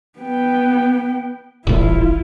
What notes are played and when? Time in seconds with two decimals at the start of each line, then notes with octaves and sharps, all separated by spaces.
0.19 B3 G5
1.67 D#1 A1 E4 F4